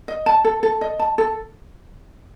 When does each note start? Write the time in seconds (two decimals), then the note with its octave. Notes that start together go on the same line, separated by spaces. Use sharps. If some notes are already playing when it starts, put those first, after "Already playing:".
0.08 D#5
0.26 A5
0.44 A4
0.63 A4
0.81 D#5
0.99 A5
1.18 A4